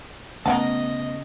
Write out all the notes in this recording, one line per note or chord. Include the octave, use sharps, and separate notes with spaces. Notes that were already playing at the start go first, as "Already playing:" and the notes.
C#3 A3 B3 A#4 D#5 F#5 A5